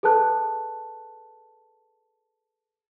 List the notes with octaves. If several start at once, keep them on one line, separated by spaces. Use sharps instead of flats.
G#4 A4 B4 A5 F#6